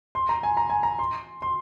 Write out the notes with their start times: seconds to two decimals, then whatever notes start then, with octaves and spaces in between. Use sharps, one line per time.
0.15 C6
0.29 A#5
0.43 G#5
0.57 A#5
0.70 G#5
0.83 A#5
0.99 C6
1.42 C6